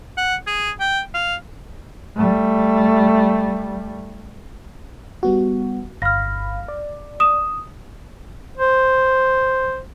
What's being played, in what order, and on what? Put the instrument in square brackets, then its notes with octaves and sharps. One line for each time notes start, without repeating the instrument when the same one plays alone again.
[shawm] F#5
G#4
G5
F5
[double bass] G3 A3
[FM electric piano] G3 B3 F#4
[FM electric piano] G1 F5 B5 [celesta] F6 A#6
[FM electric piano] D5
[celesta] D#6 E7
[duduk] C5